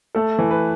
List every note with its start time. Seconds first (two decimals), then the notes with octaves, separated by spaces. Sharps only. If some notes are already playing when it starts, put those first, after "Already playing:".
0.15 A3 A4
0.39 E3
0.51 B4